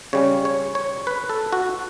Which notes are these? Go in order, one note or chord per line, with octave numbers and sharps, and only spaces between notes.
C#3 G3 C#4 C#5
C#5
C#5
B4
A4
F#4